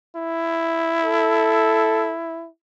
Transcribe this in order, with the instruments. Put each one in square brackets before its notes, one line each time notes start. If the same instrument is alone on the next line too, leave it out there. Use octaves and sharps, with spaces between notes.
[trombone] E4
[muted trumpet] A4